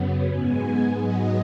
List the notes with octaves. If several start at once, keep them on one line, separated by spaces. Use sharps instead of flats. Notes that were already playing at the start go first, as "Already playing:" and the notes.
Already playing: F#2 C#3 F#3 B3
G#2 G#3 B3 G#5
G#2 F#3 B3 D#5